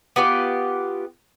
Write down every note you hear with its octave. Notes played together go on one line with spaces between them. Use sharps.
B3 F4 G4